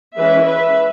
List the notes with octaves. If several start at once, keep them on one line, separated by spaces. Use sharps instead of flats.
E3 G#3 C#4 B4 E5
B4 E5